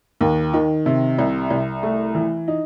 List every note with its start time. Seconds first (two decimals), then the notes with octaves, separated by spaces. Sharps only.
0.21 D#2
0.53 D#3
0.86 C3
1.19 C2
1.50 C2
1.83 A3
2.15 E3
2.48 D#4